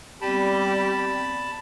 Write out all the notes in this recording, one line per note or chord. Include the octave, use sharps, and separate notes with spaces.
G3 B3 C4 G4 D5 A5 B5